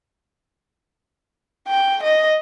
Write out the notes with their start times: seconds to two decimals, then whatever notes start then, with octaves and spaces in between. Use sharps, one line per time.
1.68 G5
2.02 D#5